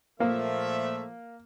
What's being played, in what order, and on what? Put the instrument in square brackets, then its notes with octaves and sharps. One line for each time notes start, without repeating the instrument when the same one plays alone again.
[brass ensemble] A#2 A3 E5 [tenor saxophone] F3 [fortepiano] A#3